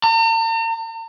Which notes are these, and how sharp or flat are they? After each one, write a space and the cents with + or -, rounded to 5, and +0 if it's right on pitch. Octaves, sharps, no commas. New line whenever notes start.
A#5 -45